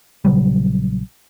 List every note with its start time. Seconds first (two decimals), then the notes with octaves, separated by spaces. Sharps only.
0.25 A#1 C#3 F#3 G3